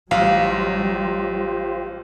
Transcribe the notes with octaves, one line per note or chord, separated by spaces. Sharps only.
A1 F#3 G3 F4 G4 C5 F5